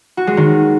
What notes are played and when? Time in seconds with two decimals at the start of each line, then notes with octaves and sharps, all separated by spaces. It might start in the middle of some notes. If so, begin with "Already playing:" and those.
0.17 F#4
0.27 G#3
0.37 D#3